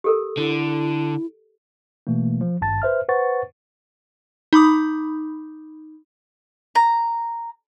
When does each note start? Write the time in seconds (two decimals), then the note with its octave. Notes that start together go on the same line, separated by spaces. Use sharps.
0.04 G4 A4 A#4
0.37 D3 E4
2.07 B2 E3 A3 A#3
2.41 F3
2.61 G#1 G2 A5 A6
2.82 B4 C5 E5 F6
3.09 B4 C5 F#5 C#6 A6
4.53 D#4 B5 D6 D#6
6.75 A#5